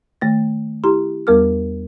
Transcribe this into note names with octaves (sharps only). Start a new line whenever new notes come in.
D#3 A3 A6
E4 G4 A#5 C6
E2 G3 B3 A#4 D6 F6